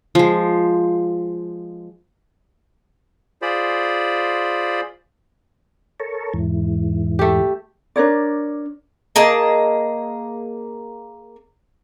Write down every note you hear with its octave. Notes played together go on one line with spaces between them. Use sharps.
F3 G#3
F4 G#4 C5 D5 B5
A4 A#4 C#5
E2 G#2 E3
A3 G4
D4 A#4 C#5 D5
A#3 G#4 D#5 A5